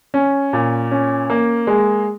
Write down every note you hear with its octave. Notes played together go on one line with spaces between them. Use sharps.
C#4
A#2
C#4
A#3
G#3